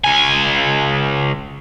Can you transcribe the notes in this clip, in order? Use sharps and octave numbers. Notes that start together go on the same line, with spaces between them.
C#2 G#5